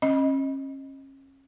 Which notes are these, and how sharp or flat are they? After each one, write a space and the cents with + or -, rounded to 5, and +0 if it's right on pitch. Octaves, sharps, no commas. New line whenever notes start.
C#4 -35 D#5 +0